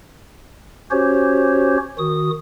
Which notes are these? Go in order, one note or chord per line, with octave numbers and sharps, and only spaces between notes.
C#4 F#4 G4 C5 C#5
D#3 F#4 D#6